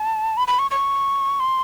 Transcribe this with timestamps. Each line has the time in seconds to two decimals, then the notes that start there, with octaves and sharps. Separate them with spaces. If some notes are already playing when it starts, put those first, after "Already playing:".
Already playing: A5
0.37 B5
0.48 B5
0.59 C#6
0.71 C#6
1.40 C6